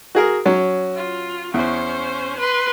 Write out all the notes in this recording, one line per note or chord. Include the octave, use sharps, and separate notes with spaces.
F#4 G#4 A#4
F#3 C#4
F4
E2 C#4 C5
B4 C6